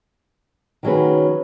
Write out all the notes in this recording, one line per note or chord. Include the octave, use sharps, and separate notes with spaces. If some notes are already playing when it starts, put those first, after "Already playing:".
D#3 F#3 C#4 G#4 B4